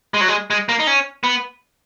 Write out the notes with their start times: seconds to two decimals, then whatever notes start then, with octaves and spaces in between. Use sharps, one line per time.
0.14 G#3
0.21 F#3
0.28 G#3
0.50 G#3
0.69 A#3
0.80 D#4
0.87 C#4
1.24 B3